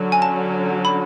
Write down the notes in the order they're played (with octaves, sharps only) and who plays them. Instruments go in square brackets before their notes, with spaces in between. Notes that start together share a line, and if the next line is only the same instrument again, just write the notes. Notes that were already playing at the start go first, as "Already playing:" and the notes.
Already playing: [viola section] D3 F#3 C#4
[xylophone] G#5
A5
B5